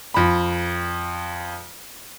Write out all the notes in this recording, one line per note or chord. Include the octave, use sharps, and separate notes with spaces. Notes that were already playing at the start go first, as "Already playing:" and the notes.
F2 B5